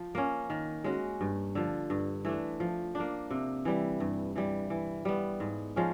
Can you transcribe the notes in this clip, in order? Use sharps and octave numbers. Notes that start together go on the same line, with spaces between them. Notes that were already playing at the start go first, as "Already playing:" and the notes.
Already playing: F3
A#3 C#4
D#3
G#3 C#4 F#4
G2
D3 F3
G2
E3 A3 D4
F3
D4
A#3
C3
E3 G3
G2
E3 G3
E3
G3 B3
G#2
F3 G#3 C#4